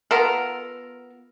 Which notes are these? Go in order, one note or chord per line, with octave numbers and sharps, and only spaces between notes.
B3 F4 A4 A#4